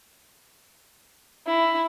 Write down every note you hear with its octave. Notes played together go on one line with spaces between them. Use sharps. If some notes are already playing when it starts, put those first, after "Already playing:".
E4